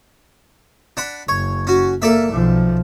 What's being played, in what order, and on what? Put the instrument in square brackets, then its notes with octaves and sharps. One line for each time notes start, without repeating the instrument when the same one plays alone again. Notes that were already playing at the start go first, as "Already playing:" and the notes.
[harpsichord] D4 F#5 B5
[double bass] F#1 [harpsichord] C#5
[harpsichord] C#4 F#4
[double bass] A#3 [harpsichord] A4 D5 E5
[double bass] B1 F3